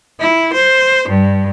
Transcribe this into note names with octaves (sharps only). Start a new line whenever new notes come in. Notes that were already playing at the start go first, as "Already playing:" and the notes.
E4
C5
G2